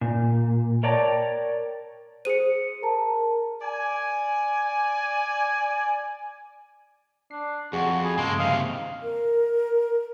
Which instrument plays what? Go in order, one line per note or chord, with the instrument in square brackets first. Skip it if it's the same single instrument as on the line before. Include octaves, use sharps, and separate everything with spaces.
[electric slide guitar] A#2
A#4 C#5 D5 G5 A5 A#5
[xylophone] G#4 D#7 [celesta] C5 C#7
[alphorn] A#4 [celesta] A5 A#5
[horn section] D5 G#5
[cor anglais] D4 [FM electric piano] C7
[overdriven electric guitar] F2 [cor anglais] F#4 [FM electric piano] G#4
[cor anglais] G#4 [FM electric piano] B5
[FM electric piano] G2 C#3 [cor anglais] G#3 [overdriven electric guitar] A#3 A4
[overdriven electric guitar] D#2 C3 [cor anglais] F5
[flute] A#4